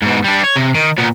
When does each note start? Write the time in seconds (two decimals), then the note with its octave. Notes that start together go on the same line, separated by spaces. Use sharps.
0.02 G#2 B2
0.24 G3 D4
0.43 C#5
0.56 C3
0.75 D#3
0.98 A#2 B3